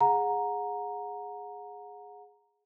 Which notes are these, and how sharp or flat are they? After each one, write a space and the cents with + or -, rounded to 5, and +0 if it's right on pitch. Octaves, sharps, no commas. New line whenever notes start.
G#4 +0 F#5 -30 A#5 +0